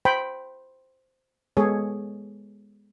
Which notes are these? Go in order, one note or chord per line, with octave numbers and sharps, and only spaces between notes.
C5 G5 B5
G#3 B3 G#4 A4 C#5